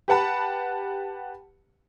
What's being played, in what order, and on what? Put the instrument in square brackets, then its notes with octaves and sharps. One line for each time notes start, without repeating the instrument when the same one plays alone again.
[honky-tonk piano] G4 B4 F#5 A5 B5